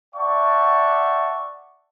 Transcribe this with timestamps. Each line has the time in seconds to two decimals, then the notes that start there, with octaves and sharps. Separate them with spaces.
0.15 D5 E5 F#5 G5 A5 C#6